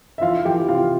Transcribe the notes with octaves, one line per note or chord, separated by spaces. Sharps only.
E5
E3 F4 F5
E3 G4 G5
C3 F4 F5